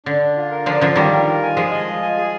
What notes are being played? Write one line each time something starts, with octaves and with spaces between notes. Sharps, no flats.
D3 D4
D4
F4
A#4
D3 F3 D4
D3 F3 D4
D#3 G3 F4
A#4
F4
G#5
F3 G#3 G#4
D#5
F4
G#5
G#4